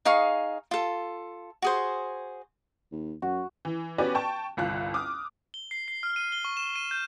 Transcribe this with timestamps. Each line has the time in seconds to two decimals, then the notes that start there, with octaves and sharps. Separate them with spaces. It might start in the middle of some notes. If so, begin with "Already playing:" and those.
0.05 D#4 G#4 F5 C#6
0.71 F4 A4
1.62 F#4 G#4 C5
2.92 D#2
3.22 F#2 F#4
3.65 E3
3.98 B3 C#4 F#4 G4 B4 D5
4.15 G5 A5 C#6
4.57 G1 C2 F4 F#6
4.94 D6 D#6 F6
5.54 G7
5.71 C7
5.88 C7
6.03 F6
6.16 D#7
6.32 G7
6.45 C#6
6.57 E7
6.76 D#7
6.91 G6